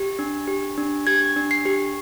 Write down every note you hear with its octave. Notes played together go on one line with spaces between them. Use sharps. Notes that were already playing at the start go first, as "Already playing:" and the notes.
Already playing: G4
D4
G4
D4
G4 G#6
D4
C7
G4